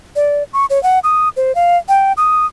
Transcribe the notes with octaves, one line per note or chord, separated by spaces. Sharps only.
D5
C#6
C#5
F#5
D#6
C5
F5
G5
D#6